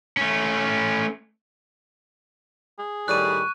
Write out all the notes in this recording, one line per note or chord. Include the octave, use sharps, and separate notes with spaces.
A3 C#4
G#4
A2 D#3 G3 C#6 F#6 D#7